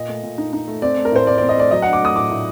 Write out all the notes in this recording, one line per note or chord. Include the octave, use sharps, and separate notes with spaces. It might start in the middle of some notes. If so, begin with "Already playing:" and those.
Already playing: A#2 D#5
A3
A#2
D#4
D#4
A3
C4 D5
A3
A#4
A2 C5
C4 D5
C4 D5
D#5
A3 D5
F#3 D#5
D4 F#5
D6
A3 D#6
A2 D6
A2